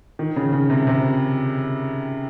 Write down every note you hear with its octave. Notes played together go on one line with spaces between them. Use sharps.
D#3
C#3
C#3
C3
C3